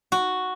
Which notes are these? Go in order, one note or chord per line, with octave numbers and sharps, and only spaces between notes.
F#4